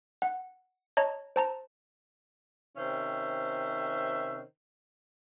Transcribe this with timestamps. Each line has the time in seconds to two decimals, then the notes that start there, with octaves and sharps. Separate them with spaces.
0.22 F#5
0.97 C#5 D#5 A5 A#5
1.36 C5 A5 A#5
2.76 C3 D#3 C#4 C5 E5